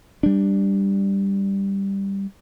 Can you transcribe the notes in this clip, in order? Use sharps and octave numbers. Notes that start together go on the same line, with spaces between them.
G3 D4